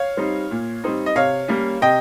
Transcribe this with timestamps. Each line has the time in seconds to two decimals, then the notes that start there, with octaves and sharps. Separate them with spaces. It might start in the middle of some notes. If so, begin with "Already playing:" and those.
Already playing: C#5 F5
0.17 G3 C4 D#4
0.51 A#2
0.84 G3 C4 D#4
1.06 D#5
1.16 C3 C#5 F5
1.48 G3 A#3 C#4
1.81 C3 D#5 G5